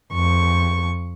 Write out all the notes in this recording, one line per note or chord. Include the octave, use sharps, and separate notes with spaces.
F2 C#6